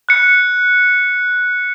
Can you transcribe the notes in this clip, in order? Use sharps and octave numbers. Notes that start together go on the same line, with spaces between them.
F#6 C#7